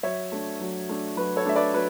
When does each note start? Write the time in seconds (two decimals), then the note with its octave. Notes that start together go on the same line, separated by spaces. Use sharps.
0.03 F#3 C#5 E5
0.32 A3 D4
0.61 F#3
0.89 A3 D4
1.17 F#3 B4
1.36 A4 C#5
1.45 A3 D4 E5
1.56 B4 D5
1.74 F#3 B4